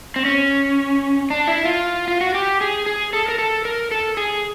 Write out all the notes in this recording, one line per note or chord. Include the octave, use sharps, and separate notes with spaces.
C4
C#4
D4
E4
F4
F4
F#4
G4
G#4
G#4
A4
A#4
A4
A#4
A4
G#4